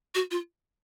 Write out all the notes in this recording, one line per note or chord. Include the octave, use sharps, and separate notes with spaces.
F#4
F4